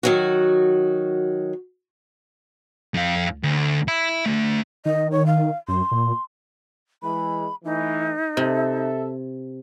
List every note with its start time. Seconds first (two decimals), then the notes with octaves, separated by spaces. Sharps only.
0.03 D#3 F#3 F#4
2.94 F2 F5
3.43 D2
3.88 E5 B5
4.26 D2 A3
4.85 D#3 D#5
5.12 C#5
5.26 F5
5.68 F#2 C6
5.91 A#2
7.02 E3 G#3 B5
7.64 E3 A3 D#4
8.37 C3 A4 E5